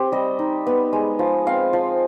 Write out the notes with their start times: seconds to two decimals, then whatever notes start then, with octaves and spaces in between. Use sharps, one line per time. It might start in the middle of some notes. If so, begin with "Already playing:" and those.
Already playing: C4 G4
0.12 G3 D#5
0.39 D#4
0.67 B3
0.93 G#3
1.19 F3
1.47 C4 F5
1.73 F3